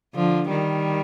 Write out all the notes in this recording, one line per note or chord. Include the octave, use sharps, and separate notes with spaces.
D3 F3
D#3 G3